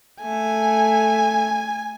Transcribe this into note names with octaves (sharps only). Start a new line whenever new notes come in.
A3 G#5